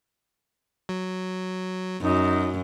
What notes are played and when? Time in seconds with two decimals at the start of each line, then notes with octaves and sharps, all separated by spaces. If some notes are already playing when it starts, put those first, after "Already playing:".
0.89 F#3
2.01 F#2 D#4